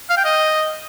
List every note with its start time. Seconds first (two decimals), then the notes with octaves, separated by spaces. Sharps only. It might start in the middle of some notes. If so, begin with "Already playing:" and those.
0.10 F5
0.17 G5
0.24 D#5